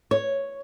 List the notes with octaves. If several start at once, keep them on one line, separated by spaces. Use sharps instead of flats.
C#5